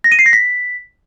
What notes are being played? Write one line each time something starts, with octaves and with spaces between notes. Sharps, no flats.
A#6
D#7
C7
A#6
B6